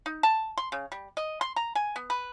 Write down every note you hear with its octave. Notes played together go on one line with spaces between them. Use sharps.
D#4
A5
C6
C#3
G3
D#5
C6
A#5
G#5
B3
B4